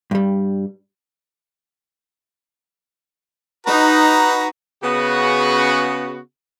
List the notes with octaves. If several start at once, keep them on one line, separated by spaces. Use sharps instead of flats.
G2 G3
D#4 F#4 B4 A#5
C#3 B3 F#4